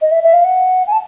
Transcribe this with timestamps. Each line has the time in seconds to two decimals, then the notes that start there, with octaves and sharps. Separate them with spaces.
0.01 D#5
0.11 E5
0.23 E5
0.33 F5
0.44 F#5
0.87 G#5
0.92 A5